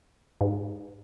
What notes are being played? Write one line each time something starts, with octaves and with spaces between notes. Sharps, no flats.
G#2